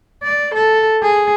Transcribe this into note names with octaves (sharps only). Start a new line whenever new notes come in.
D5
A4
G#4